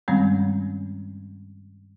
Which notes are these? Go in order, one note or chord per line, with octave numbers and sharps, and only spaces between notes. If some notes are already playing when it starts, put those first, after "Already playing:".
G2 D#3 G3 G#3 C4 C#4